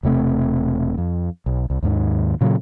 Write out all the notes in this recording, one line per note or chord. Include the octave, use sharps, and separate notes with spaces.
E1 C3 A3 C4
F2
B1
C2
D#2 G#2 D#3
A#2 C#3 F#3